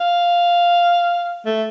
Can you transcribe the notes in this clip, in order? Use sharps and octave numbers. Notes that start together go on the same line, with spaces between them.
F5
A3